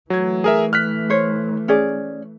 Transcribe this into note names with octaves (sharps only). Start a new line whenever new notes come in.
E3 F#3 A3 G#6
G#4 A#4 E5
F6 F#6 B6
C5 C#5
C#4 G#4 D5